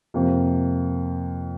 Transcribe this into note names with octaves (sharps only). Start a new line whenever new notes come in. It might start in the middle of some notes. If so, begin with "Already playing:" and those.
F2 C3 F3 A#3